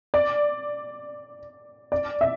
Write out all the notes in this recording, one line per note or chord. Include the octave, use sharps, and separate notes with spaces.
D5
D5
E5